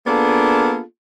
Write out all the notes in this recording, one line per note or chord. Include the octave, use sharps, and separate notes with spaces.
A#3 B3 D4 F4 G#4 A4